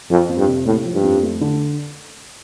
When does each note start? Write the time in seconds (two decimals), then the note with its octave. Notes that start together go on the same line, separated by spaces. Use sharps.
0.10 F2 F3
0.29 F2
0.38 G2
0.48 C3
0.66 A2 A#3
0.85 F3
0.94 G2
1.03 F2
1.23 A3
1.41 D3